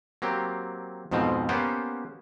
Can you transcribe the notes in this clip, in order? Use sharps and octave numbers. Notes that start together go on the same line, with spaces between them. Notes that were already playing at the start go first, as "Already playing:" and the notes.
F#3 A#3 C4 G4
F2 G#2 B2 F3 C4
A#3 B3 C#4 G4 C5 F#5